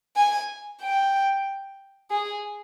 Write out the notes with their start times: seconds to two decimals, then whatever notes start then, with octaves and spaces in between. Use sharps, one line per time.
0.17 G#5
0.82 G5
2.11 G#4